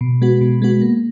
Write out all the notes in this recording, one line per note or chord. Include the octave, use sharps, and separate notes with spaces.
B2
G#3 B3 F#4
B2
G#3 B3 F#4
A#3